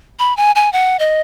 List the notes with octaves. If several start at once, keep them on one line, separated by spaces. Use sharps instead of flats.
B5
G#5
G#5
F#5
D#5